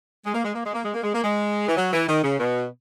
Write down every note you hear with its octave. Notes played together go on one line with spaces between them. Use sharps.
G#3
A#3
G#3
A#3
G#3
A#3
G#3
A#3
G#3
A#3
G#3
E3
F#3
E3
D#3
C#3
B2